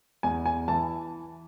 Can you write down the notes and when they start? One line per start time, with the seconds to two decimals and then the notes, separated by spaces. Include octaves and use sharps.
0.23 E2 G#5
0.46 G#5
0.68 E3 A5